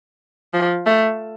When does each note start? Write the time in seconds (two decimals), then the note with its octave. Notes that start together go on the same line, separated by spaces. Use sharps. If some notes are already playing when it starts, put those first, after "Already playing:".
0.54 F3
0.86 A3